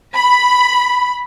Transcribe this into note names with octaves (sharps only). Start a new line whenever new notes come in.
B5